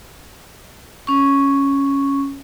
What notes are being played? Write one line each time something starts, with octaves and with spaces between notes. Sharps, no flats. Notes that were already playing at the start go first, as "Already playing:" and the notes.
C#4 C#6